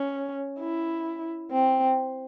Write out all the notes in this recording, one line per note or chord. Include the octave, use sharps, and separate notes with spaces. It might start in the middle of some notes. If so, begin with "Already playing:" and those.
Already playing: C#4
E4
C4